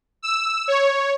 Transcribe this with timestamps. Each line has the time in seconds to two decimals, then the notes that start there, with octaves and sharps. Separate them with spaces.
0.22 E6
0.68 C#5